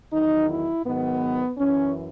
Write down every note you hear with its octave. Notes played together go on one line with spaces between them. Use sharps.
E2 D#3 F#3 D#4
E4
G#2 D#3 F#3 B3
F#2 E3 C#4